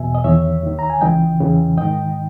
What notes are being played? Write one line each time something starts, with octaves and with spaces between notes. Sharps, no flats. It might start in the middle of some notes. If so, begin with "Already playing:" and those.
Already playing: E2 B2 E5 G#5
D#5
E2 D#3 C#5 E5
D#2 D#3
A#5
G#5
C#2 C#3 E3 D#5 G5
E2 C#3 E3
G#2 D#3 D#5 G5